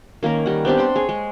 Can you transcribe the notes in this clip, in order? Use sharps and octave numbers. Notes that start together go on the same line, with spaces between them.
D#3 A#3 C#4 A#4
G3 F#5
B3 C4 D4 G4
F#5 G5 C6
G#4 C#5
G#3